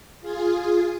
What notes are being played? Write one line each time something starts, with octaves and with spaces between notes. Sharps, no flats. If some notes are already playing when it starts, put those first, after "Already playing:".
F4 G#4